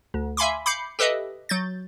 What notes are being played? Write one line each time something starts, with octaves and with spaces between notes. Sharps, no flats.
D2
E5 F5 G#5 B5 C6 D6
B5 D6 G6 C7 C#7
G4 A4 B4 D#5 E5
F#3 G6 A6